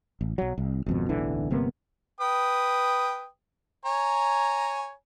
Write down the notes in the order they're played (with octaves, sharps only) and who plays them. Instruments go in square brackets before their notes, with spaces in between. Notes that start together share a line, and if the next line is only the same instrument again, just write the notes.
[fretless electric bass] A1
B1 F#3
C2
G#1 F2 B2
D1 B1 D3 E3
G1 C3 A#3 B3
[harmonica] B4 G5 D#6
C#5 G#5 A#5